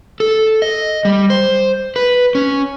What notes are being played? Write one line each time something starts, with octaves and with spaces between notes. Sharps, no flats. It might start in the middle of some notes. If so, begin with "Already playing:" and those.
A4
D#5
G3
C5
B4
C#4